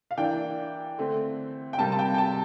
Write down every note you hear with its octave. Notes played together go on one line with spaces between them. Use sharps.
F5
E3 A#3 D4 G5
D3 A3 C4
G5
C3 G3 A#3 A5
A5
G5
G5
A5